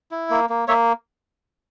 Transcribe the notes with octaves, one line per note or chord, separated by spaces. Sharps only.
E4
A#3
A#3
A#3 C#5 E5